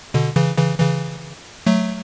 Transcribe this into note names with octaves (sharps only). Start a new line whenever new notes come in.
B2 D3
C#3 E3
C#3 E3
C#3 E3
F#3 A3